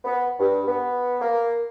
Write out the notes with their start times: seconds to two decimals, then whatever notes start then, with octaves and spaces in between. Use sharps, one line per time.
0.04 B3
0.39 G2
0.67 B3
1.20 A#3